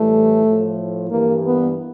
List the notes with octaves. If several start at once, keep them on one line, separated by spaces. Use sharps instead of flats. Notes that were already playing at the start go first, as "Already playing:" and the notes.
Already playing: A2 E3 G3 A3
A2 F3
G2 E3 G3 A#3
B3